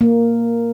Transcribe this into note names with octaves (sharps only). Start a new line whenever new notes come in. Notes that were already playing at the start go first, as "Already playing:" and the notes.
A#3